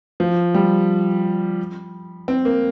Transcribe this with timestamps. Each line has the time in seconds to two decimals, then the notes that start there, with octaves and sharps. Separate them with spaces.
0.20 F3
0.54 G3
2.28 C4
2.45 A#3